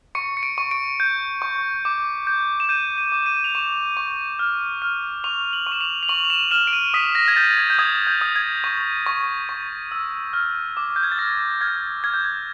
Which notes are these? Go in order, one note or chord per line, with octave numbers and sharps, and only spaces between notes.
C#6 C#7
C#7
D7
C#6
D7
G6
C#6
D6
G6
E7
G6 D#7
D#7
D6
D#7
F7
C#6 E7
C#6
F6
F6
C#6 F7
F#7
C#6
E7
F7
F7
C#6 F#7
F7
E7
F6 E7
D7
D#7
D#6 B6
A#6
G#6
G6 A6
G#6
G6
D#6 G#6
G6
D#6
G#6
C#6
C#6
C#6
E6
F6
D6
G6
G#6
A6
F6 A#6
F6 G#6
A6
G#6
F6 G#6
G6
G#6